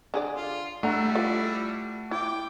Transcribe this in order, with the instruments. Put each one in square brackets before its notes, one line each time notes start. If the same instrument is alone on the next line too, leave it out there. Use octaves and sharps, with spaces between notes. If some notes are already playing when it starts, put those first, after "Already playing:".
[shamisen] D3 G#4 D5
[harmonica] F4
[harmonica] G3 E4 [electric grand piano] A3 F#5 [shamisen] D4 A#5
[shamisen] F4 A4
[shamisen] E4 [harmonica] G5 D6